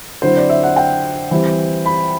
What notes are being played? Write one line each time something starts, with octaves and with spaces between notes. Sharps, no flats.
D3 F#3 C4 E4 C5
D5
E5
F#5
G5
E3 G3 C4 E4
B5